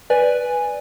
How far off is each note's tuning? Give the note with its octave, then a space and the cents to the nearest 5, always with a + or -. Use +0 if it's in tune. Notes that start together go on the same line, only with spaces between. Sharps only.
B4 +0 D5 +0 G#5 +0